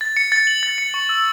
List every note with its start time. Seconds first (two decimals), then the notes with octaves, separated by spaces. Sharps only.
0.01 A6
0.17 C#7
0.32 A6
0.47 F#7
0.63 A6
0.78 C#7
0.94 C#6
1.09 E6